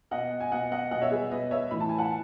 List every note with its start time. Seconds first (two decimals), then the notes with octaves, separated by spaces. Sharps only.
0.11 B2 D#5 F#5
0.40 G#5
0.52 B2 D#5 F#5
0.71 D#5 F#5
0.91 B2 D#5 F#5
1.02 C#5 E5
1.11 G#4 B4
1.31 B2 B4 D#5
1.51 C#5 E5
1.71 A2 E3 B5
1.80 A5
1.89 G#5
1.98 F#5 A5